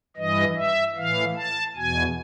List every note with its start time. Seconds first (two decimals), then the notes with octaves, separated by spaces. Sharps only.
0.17 G2 E3 D#5
0.56 E5
0.96 A2 E3 F5
1.36 A5
1.75 E2 B2 G#5